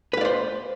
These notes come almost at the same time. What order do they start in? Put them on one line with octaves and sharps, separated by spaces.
B4 F5 D5 C5